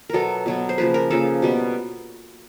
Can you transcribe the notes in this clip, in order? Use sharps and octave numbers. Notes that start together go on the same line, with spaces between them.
B2 F#3 B3 A4 A#4
B2 F#3 B3
C5
C#3 F3 A#3 B4
A#4
C#3 F3 A#3 A4
B2 G3 B3